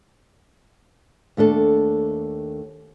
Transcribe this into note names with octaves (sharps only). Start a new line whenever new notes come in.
D#2 A3 D4 A4